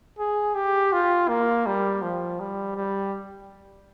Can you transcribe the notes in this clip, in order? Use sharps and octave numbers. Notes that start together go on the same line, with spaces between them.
G#4
G4
F4
A#3
G3
F3
G3
G3